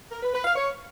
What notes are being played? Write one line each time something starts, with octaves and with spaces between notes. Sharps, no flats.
A#4
B4
B4
F5
C#5